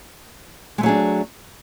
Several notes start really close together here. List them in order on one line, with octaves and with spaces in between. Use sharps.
G#3 A3 F#3 G#4 D4